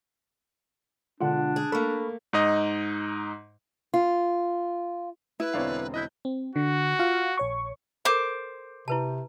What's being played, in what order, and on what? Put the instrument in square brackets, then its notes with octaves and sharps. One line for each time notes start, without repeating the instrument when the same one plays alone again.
[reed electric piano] B2 D3 G#3 [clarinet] D4 [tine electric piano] F4 F#5
[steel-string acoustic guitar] G#4
[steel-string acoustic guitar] A3 A#3 [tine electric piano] A4 [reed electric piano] B5 C#6 F6
[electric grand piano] G#2 D#4 D#5
[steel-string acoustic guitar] F4
[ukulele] E4 [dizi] B4
[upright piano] E1 D3 C4 [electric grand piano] C#5 D5 F5
[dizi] E4 [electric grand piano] D#5 F#6 G6
[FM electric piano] C4
[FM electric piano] D3 [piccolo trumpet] F#4
[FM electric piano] F4 F5
A#1 C#5 C#6
[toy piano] A4 A#4 [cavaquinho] C5 D6
[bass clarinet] C3 [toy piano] E4 B4 A5